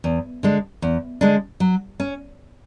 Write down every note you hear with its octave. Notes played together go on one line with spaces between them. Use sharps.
E2
D3 G#3 D4
E2
D3 G#3 D4
F#3
C#4